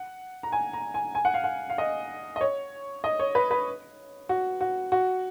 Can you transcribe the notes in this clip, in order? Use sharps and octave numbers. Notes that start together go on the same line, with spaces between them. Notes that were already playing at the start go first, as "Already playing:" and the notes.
Already playing: F#5
A#5
G#5
A#5
G#5
G#5
F#5
F5
F#5
F5
D#5
D#5
C#5
D#5
C#5
B4
B4
F#4
F#4
F#4